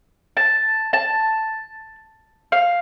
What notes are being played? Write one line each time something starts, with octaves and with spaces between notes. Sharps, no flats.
A5
A5
F5